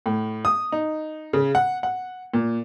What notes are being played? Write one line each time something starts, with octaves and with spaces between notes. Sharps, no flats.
A2
D#6
D#4
C#3
F#5
F#5
A#2